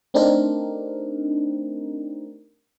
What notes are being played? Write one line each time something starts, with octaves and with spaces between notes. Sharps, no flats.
A3 C4 D4 D#4 G4 A#4